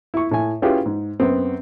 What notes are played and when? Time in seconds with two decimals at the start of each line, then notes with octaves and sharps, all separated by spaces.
0.14 E4 C#6
0.31 A2 G#5
0.62 C#4 E4 F4 G4 G#4 B4
0.86 G#2
1.20 F#2 B3 C4